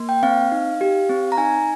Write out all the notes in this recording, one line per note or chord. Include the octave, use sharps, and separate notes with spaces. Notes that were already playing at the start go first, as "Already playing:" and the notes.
Already playing: A#3
G5
C4 F5
D#4
G4
C4
A#5
D#4 G#5